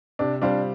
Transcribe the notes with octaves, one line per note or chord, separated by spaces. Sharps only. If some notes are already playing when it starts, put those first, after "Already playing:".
C3 D4
G3 C4 D4 F4